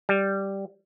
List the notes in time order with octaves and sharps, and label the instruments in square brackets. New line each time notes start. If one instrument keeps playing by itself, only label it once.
[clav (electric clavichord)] G3